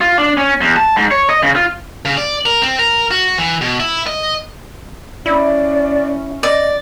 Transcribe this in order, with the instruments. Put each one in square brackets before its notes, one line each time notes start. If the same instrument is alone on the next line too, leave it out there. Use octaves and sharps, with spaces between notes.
[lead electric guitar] F4
D4
C#4
E2
A5
G#2
C#5
D#5
C#3
F4
[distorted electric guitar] C#3
D5
A#4
C4
A#4
F#4
E3
B2
E4
D#5
[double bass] C#4 [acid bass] E4 [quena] D5
[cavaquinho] D5 [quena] D#5